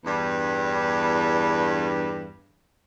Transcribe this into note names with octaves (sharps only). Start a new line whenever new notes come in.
E2 G2